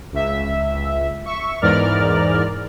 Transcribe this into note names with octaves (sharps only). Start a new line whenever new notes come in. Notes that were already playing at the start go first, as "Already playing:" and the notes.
C#2 E5
E5 C#6
E2 G#2 A#4 D5 F6